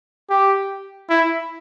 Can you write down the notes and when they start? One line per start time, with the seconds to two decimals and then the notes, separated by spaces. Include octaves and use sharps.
0.30 G4
1.09 E4